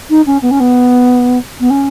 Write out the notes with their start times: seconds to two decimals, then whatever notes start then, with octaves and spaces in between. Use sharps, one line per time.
0.10 D#4
0.26 C#4
0.42 B3
0.50 C#4
0.60 B3
1.60 B3
1.70 C#4